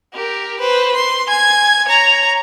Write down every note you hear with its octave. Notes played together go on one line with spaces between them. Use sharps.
G4 A#4
B4 C5
C6
G#5 G#6
C#5 A#5